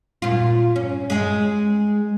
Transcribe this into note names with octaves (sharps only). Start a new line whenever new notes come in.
A#2 F4
C#4
G#3 G#4